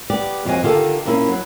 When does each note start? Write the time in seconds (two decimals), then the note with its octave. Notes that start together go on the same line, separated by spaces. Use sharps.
0.10 B3 G4 D5
0.45 F2 F4 F#4 C#5 D#5 G#5
0.63 D3 D#3 F4 G4 A4
1.05 A#2 A#3 C#4 E4
1.28 F#3